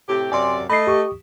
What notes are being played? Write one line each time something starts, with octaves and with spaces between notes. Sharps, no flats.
A2 C3 G4
F#2 C3 D5 G#5 C6
A3 D#5 B5 C7
G4 C#6 D#6